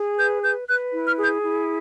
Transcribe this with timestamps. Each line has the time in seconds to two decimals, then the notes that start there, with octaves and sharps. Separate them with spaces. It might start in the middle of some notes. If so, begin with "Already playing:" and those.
Already playing: G#4
0.17 B4 G6
0.43 B4 G6
0.68 B4 F#6
0.92 E4
1.05 F6
1.17 G#4
1.23 G6
1.42 E4